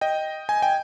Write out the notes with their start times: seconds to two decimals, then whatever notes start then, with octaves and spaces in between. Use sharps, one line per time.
0.01 D#5 G5
0.49 G#5
0.62 G5